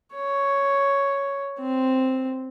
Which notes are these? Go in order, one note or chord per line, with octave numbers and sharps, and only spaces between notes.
C#5
C4